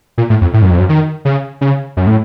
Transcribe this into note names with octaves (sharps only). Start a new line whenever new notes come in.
A#2
A2
F2
A2
F#2
F2
F#2
D#3
C#3
C#3
F#2
A2